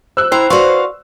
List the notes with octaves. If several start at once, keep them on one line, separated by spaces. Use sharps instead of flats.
C5 E6 F#6
E4 C5 G5 A#5
F#4 B4 D5 F5 C6 C#6